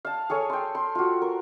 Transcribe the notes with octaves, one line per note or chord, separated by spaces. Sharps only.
F5 A5
G#4 A4 C#5 G#5
G5 C6
C6
F4 F#4
A#4